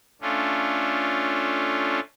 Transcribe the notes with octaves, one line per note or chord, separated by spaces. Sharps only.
A3 C#4 D4 F4